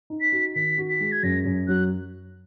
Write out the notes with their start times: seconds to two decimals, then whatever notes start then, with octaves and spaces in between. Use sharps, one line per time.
0.10 D#4
0.21 B6
0.32 F#4
0.55 D#3 B6
0.78 F#4
0.89 B6
1.00 G#3
1.12 G#6
1.23 F#2 A#6
1.45 F#2
1.68 F#3 F#6